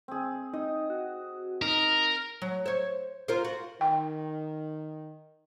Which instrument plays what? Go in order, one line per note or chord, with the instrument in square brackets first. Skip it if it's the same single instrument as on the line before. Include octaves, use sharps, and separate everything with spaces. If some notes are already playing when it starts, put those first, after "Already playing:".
[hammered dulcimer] C4 G#4
[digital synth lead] D#4 [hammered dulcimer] D#5
[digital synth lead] F#4
[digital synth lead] D#4 [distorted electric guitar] A#4
[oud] F#3
C5 C#5
F4 A#4 C5
F#4
[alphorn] D#3 [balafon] G5